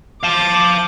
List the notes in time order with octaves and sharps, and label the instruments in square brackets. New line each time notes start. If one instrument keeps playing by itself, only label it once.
[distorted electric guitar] F5 A5 [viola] D6